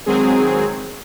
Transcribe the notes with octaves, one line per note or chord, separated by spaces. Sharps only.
D#3 F#3 G#3 C4 G#4